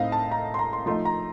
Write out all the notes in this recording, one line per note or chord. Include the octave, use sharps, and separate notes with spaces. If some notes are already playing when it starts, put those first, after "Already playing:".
Already playing: A2 A3 C4 D#4 D#5 F5
A5
A#5
C6
A#5
C6
F3 A3 D#4 C6
A#5